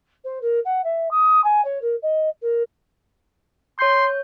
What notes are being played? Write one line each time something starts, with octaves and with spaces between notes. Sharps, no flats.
C5
A#4
F#5
E5
D#6
G#5
C#5
A#4
D#5
A#4
C#5 C6 G6